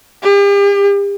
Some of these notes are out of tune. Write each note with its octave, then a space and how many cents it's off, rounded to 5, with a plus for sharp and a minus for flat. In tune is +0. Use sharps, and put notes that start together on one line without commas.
G4 +40